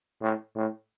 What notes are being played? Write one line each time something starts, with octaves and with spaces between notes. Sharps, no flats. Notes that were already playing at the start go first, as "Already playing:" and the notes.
A2
A2